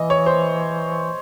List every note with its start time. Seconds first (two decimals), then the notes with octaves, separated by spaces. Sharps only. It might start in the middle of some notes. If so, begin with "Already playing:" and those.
Already playing: E3 D#5
0.10 C#5
0.26 C5